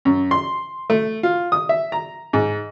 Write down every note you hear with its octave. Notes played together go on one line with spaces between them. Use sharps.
F#2
C6
A3
F4
D#6
E5
A#5
G#2